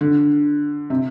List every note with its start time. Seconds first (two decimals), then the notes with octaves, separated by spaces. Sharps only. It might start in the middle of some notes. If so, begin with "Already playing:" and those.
0.01 D3
0.90 C3